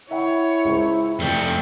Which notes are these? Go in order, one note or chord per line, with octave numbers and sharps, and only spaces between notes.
E4 C#5 E5 F#5 G5
C#2 C5
F2 A3 D5 G5